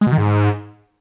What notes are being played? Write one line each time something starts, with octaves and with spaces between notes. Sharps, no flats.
G#3
B2
D#3
G#2